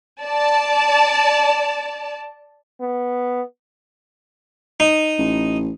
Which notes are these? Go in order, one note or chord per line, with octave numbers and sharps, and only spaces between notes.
D5 A5
B3
D#4
A1